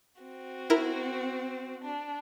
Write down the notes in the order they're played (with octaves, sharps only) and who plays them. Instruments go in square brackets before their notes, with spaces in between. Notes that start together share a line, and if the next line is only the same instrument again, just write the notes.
[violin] C4 F#4
[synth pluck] E4 A#4
[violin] D4